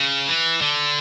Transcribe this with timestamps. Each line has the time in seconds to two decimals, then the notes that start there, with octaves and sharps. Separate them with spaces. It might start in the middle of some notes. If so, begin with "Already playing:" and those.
Already playing: C#3
0.27 E3
0.61 D3